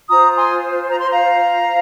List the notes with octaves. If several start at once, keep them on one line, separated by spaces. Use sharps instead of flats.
F4 C5 A#5 D#6
G#5 C6
A#5
C6
F5 A#5